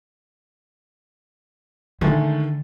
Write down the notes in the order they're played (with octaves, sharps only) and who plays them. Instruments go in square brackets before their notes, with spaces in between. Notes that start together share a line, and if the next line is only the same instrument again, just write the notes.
[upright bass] D3 [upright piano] D#3 G#3 A3